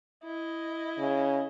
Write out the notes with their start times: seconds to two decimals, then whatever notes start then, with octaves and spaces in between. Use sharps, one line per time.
0.24 E4 D#5
0.98 C#3